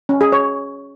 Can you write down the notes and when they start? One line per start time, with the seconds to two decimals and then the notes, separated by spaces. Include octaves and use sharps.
0.09 C#4
0.21 G#4
0.32 C#5